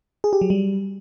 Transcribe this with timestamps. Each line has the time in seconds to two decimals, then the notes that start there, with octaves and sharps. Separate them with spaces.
0.24 G#4
0.33 G4
0.41 F#3
0.50 G3